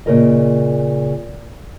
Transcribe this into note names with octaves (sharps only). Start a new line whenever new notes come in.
A#2 C#3 A#4 D#5